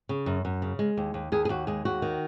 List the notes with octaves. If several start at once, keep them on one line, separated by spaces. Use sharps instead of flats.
C#3
F#2
F#2
C#3
G#3
D#2
D#2
D#2 G#4
G#4
D#2 F#4
G#3 G#4
D#2 F#4
D#3